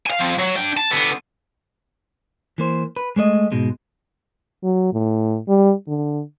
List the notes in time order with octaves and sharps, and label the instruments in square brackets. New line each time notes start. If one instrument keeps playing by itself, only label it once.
[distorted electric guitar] F5 G#5
F3 C4
F#3
D4 G5
A5
D3 B3
[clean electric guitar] E3 A#3 C5
B4
G#3 A3 C#5 D#5
G#2 B2 G#3
[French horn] F#3
A2
G3
D3